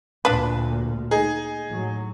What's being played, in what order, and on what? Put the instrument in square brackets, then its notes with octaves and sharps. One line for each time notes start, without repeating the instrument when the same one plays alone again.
[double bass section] D2 A#2 [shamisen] D4 B4
[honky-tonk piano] D#4 G#4
[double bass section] A2 F#3